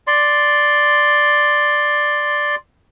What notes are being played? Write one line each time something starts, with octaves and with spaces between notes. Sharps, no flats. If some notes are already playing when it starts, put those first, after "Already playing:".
D5 C6